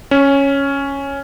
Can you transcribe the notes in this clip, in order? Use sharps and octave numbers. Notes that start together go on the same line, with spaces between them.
C#4